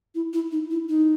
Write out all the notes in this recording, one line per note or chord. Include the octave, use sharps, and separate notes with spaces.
E4
E4
D#4
E4
D#4